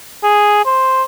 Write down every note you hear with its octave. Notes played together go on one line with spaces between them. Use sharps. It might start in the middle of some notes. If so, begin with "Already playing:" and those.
G#4
C5